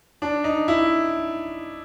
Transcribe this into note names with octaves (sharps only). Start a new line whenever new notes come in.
D4
D#4
E4